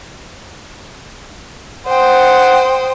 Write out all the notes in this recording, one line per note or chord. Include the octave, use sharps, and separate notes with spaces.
C5 F#5 G5 D#6